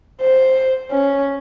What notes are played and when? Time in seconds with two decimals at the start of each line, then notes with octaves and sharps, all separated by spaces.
0.21 C5
0.91 C#4